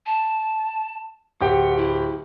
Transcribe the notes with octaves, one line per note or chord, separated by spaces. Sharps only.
A5
D1 G4 F#5 G5
E4